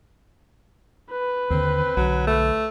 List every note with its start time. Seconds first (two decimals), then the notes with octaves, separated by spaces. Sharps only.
1.11 B4
1.50 D#2 D3 C4
1.96 B1 D3 F#3
2.27 A3